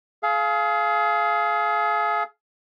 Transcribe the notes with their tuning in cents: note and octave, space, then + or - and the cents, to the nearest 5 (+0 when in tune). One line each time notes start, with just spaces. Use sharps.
G#4 +35 F5 -10